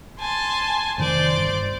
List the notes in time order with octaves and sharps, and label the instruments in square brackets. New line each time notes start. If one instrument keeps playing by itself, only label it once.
[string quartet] G#5 A5 C6
[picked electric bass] F1 B2 D#3 [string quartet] C5 D5
[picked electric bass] G1